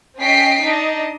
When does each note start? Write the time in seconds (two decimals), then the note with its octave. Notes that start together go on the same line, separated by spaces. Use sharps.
0.20 C#4 D#5 G5 B6 C7 D7
0.61 D4 D#4 D#5